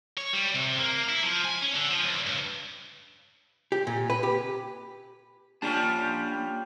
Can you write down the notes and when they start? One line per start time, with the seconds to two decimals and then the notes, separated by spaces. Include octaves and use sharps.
0.17 C#5
0.33 G3
0.54 C3
0.79 A#3
1.09 E4
1.23 F3
1.44 G#5
1.62 C#4
1.76 D3
1.91 F3
2.04 C#2
2.27 G2
3.72 G4
3.87 A#2
4.10 B4
4.23 G4
5.62 G3 A#3 C#4 D4 F4 A5